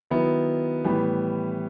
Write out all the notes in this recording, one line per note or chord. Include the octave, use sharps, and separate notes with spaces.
D#3 F#3 B3 E4
A2 E3 G3 B3